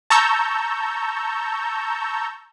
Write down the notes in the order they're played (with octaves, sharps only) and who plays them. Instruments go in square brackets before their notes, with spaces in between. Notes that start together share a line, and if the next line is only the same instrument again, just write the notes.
[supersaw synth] A5 A#5 C#6 E6 G6